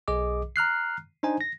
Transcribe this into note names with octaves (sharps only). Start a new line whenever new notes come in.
B1 G#4 D#5 D6
A#5 F6 F#6 C7
D4 D#4 C5 G#5
A#6